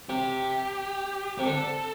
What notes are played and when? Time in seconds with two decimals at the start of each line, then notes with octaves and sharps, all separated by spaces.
0.09 C3 G4
1.38 C3 G4
1.46 D3 A4